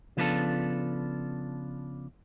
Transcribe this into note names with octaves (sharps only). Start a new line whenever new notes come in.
C#3 F3 B3 D4 F4 A4